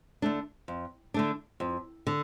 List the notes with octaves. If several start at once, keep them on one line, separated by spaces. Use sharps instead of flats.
D3 A3 D4
F2
D3 A3 D4
F2
D3